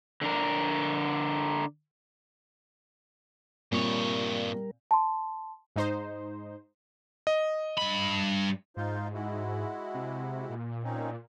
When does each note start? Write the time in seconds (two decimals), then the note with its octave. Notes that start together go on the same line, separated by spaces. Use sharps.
0.21 D3 D4 A#4
3.72 G2 A#2 G3 C4 A#4 C#5
4.91 A5 C6
5.76 G#2 D#4 C5
7.27 D#5
7.77 G2 B5
8.77 G#2 D#4 F4 C5
9.14 G#3 E4 F#4
9.94 C3
10.50 A#2
10.84 C4 C#4 D#4